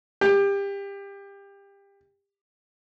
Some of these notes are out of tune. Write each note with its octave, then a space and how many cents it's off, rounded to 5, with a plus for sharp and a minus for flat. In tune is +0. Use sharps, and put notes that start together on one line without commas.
G4 +25